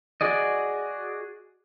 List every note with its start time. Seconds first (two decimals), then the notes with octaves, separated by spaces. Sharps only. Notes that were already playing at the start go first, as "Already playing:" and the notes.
0.21 F#4 G#4 D5 D#5